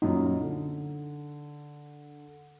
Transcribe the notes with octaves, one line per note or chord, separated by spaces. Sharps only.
F#2 A#2 D#4
D3